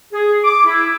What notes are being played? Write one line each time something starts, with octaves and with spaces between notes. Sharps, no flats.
G#4
D6
E4